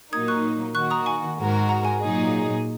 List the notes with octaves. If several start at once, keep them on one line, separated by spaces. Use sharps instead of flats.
A#2 F#3 A#3 D#4 D#6 G#6
C#6 F#6
D#3 A#3 F#4 C#6 F#6
A#5 D#6
G#5 C#6
G#2 G#3 F#4 A#4
F#5 A#5
G#5
A#2 F#3 D#4 G#4